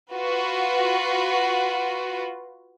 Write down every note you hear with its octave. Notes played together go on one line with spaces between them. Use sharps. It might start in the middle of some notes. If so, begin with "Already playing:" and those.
F4 F#4 B4